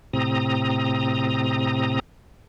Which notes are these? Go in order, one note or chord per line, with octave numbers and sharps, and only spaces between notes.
A2 C3 C4 A#5 D#6